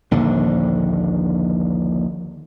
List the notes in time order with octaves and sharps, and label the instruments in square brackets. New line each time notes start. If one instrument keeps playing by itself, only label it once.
[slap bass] A#1 D#2 D3